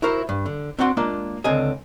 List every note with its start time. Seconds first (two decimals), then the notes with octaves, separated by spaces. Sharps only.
0.02 E4 F#4 A#4 C5
0.29 G2
0.46 D3
0.79 C4 D4 F#4 F#5 C6
0.97 G#3 A#3 D4 F4
1.44 C#2 D3 C4 D#5 G#5